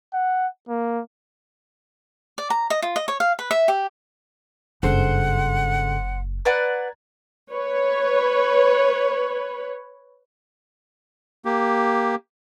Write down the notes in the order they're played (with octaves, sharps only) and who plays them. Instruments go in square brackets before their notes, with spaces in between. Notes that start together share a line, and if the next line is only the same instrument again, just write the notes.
[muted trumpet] F#5
A#3
[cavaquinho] D5
A#5
D#5
F4
D#5
C#5
F5
B4
E5
G4
[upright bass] F#1 [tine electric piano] G2 C#3 A4 [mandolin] C5 [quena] F#5
[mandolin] B4 D5 F#5 [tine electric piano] A#5 G#6 A6
[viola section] B4 C#5
[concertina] A#3 G4